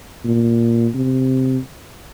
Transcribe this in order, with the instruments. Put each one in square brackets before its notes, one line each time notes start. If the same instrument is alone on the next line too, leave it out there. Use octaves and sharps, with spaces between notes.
[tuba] A#2
C3